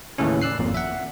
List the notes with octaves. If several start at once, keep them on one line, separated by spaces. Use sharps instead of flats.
D#2 A2 C#3 E3 C#4
D5 E6 F#6 C7
G#1 F2 A#2
E5 F#5